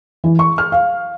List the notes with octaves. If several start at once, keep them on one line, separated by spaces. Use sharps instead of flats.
E3
C#6
F6
F5